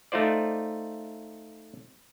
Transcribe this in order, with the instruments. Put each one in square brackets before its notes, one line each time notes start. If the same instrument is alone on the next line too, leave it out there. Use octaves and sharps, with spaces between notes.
[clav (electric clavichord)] A3 D#4 F4 C5 D5